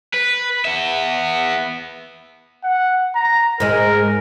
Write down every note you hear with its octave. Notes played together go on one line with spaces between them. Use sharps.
B4
B3 E5
F#5
A#5
G#2 G#3 A#4